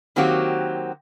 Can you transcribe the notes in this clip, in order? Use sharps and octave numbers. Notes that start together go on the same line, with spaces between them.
D#3 F#3 A#3 C4 F#4 G4